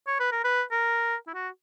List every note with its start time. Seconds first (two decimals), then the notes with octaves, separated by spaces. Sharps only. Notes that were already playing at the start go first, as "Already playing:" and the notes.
0.07 C#5
0.20 B4
0.32 A#4
0.44 B4
0.71 A#4
1.27 E4
1.34 F#4